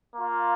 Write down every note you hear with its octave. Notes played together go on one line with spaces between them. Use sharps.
A#3 F4